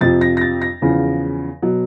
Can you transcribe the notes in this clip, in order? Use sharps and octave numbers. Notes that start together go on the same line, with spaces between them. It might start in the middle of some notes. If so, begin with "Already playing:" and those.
F2 C3 F3 A6
A#6
A#6
A6
A#6
E2 C#3 F3
B2 F#3